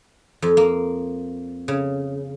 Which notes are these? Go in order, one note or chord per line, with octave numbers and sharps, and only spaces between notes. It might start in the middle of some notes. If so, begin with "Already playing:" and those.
F2
A#3
C#3